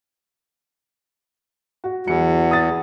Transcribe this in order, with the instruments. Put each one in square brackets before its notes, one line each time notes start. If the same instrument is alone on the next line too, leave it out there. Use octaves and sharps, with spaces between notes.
[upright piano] F#4
[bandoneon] E2 [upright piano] F#3 C#7
[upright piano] D#6 A6